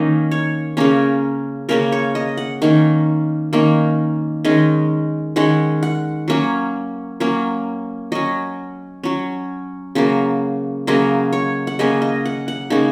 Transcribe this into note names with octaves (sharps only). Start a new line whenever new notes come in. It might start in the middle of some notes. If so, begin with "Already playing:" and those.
Already playing: D#3 A#3 C#4 D#5
C#5
C#3 A#3 C#4 A#4
C#3 A#3 C#4 A#4
C#5
D#5
F#5
D#3 A#3 C#4
D#3 A#3 C#4
D#3 G#3 C#4 D#5
D#3 G#3 C#4 F#5
F#5
F#3 A#3 C#4
F#3 A#3 C#4
F#3 C#4 D#5
F#3 C#4
C#3 F#3 A#3
C#3 F#3 A#3 D#5
C#5
F#5
C#3 A#3 C#4 D#5
D#5
F#5
F#5
C#3 A#3 C#4 D#4